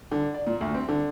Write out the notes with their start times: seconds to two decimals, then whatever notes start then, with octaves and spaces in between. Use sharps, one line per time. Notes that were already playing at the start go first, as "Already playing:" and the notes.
0.11 D3
0.34 D5
0.47 A#2
0.61 D2
0.74 C4
0.88 D3